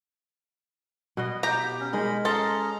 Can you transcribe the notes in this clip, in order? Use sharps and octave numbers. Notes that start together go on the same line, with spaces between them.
B2 B3 D#5
G4 A#5 G6
C#4
G#3 D#4 A#4 B5
C#4 A4 D#5 A#5 C6